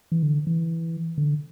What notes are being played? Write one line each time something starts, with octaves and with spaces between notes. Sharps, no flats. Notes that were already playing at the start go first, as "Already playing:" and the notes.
E3
D3
E3
D3